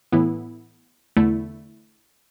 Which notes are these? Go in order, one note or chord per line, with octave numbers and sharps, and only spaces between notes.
A2 E3 B3 E4
E2 D3 A3 E4